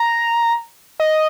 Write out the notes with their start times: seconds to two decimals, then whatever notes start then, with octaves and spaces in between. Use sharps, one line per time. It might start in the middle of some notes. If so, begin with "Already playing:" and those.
Already playing: A#5
1.00 D#5